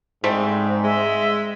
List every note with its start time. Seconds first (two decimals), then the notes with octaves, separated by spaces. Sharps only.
0.24 G#2 G3 A3 C4
0.84 G#3 E5